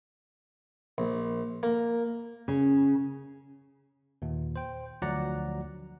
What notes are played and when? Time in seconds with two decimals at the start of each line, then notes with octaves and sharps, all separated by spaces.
0.98 A#1
1.63 A#3
2.48 C#3
4.22 D#2 A#2
4.56 C5 G5
5.02 D2 F3 F#3 D5 F#5 A#5